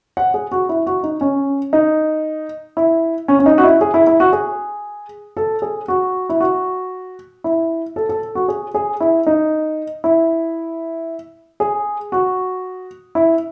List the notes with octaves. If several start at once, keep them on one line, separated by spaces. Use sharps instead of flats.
F#5
G#4
F#4
E4
F#4
D#4
C#4
D#4
E4
C#4
C#4
D#4
F#4
E4
G#4
E4
E4
F#4
G#4
A4
G#4
F#4
E4
F#4
E4
A4
A4
F#4
G#4
G#4
E4
D#4
E4
G#4
F#4
E4